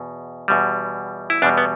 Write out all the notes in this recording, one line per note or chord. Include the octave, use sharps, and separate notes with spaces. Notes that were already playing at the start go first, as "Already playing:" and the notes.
Already playing: E2 B2
E2 B2 G3
E4
E2 B2 G3 D4
B3